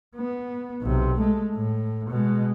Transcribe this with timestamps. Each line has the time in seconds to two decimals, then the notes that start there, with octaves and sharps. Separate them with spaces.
0.16 B3
0.82 B1 C3
1.19 G#3 A3
1.55 A2
2.10 B2 G#3